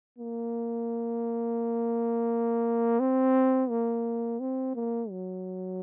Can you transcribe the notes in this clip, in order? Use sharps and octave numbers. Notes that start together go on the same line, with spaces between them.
A#3
C4
A#3
C4
A#3
F#3